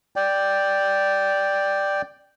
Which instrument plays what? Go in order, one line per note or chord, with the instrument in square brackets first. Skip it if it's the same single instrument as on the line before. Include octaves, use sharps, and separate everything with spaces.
[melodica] D5 G5